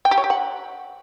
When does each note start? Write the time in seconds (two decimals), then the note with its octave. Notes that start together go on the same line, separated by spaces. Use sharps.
0.05 G5
0.11 G4
0.18 C#5
0.24 G4
0.30 F#5